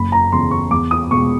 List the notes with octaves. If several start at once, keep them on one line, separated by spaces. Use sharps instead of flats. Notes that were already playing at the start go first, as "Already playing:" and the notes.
Already playing: F#1 B5
A#5
E2 C#3 C6
C#6
E2 D6
D#6
B2 G#3 C#6